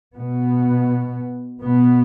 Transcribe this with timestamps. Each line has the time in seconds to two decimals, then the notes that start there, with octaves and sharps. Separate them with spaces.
0.15 B2 B3
1.62 B2 B3